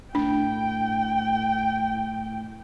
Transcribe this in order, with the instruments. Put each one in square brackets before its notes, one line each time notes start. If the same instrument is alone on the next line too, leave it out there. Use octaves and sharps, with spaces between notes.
[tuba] A2 [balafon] D4 [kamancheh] G5